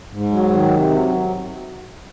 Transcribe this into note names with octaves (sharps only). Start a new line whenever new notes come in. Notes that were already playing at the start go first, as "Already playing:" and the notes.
G#2
F#3
D#3
C3
F#3